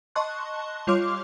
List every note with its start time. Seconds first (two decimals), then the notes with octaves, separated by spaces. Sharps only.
0.15 D#5 A5 C6 C#6 F#6
0.87 G3 F4 C#5 C6 D6 F6